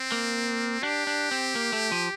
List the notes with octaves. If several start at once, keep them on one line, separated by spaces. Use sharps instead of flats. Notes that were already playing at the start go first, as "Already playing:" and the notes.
Already playing: C4
A#3
D4 G4
D4
C4
A#3
A3
F3